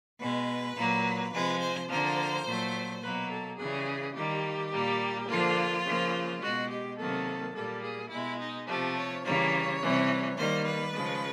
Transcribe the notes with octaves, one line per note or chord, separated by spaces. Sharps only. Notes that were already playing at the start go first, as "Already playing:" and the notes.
B2 G#3 B4
A#2 F#3 A#3
C3 F3 G#3 B4
C5
D3 F3 A#3 C5
A#2 F#3 A3
B2 F#3 A#3 B4
A4
C#3 E3 G3 G#4
D#3 G3 A#3 G4
A#2 G3 A#3
D3 F3 A#3 F4
C#3 F3 A#3
B2 G#3 F#4
G4
C3 D#3 F#3 A#3 A4
A#2 G3 A#3 A4
G#4
B2 G#3 E4
D#4
C3 F3 A3 G4
C#5
C#3 E3 G3 A#3 C#5
C3 E3 G3
D#3 G3 A#3 C5
B4
C#3 F3 G#3